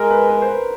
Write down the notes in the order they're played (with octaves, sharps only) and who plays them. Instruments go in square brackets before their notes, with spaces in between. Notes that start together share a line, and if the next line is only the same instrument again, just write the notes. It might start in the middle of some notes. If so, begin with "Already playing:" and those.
Already playing: [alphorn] G#3 [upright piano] A#4
[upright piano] B4
B4
C5
B4